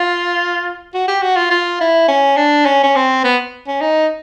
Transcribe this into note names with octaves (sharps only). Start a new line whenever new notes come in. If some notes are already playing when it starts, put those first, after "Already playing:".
Already playing: F4
F#4
G4
F#4
F4
F4
E4
C#4
D4
C#4
C#4
C4
B3
C#4
D#4